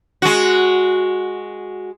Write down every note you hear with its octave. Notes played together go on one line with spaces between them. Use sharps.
G#3 F#4